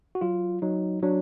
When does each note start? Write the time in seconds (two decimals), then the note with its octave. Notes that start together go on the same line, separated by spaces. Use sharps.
0.15 F#4
0.21 F#3 F4
0.62 F#3 D#4
1.02 F#3 D4